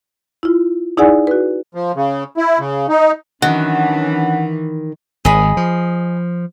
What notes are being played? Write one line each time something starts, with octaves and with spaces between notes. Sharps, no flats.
E4 F4
D#4 E4 G#4 D5 F#5 G#5
F#4 B4
F3
C#3
E4
C#3
D#4
D#3 E3 F#3 C#4 D4 F#5
G#1 G#4 D#5 B5
F3